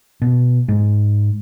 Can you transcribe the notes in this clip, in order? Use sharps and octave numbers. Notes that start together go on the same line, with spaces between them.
B2
G#2